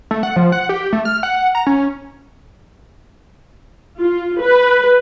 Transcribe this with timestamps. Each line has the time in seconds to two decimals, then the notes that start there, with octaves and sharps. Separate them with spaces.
0.11 A3
0.23 F#5
0.36 F3
0.52 F#5
0.69 G4
0.93 A3
1.05 F6
1.23 F#5
1.55 A#5
1.67 C#4
3.98 F4
4.40 B4